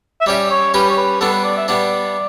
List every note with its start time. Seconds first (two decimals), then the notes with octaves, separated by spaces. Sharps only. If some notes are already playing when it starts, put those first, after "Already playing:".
0.21 E5
0.26 G3 C#4 G4 D5
0.51 C#5
0.74 G3 C#4 G4 B4
0.90 C#5
0.98 B4
1.21 G3 B3 D4 A4
1.32 B4
1.44 D5
1.57 E5
1.68 G3 B3 D4 D5